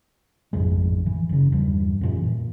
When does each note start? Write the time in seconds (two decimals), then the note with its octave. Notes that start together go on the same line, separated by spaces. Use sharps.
0.53 A1 F2 G#2 G#3
1.06 E3
1.29 F#1 C#3
1.52 E2 G2
2.01 F#2 A#2 E3
2.23 A#2